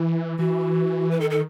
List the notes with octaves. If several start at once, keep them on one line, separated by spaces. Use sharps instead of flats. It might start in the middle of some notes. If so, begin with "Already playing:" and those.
Already playing: E3 E4
E3 F#4
B4
D#3 A4
A4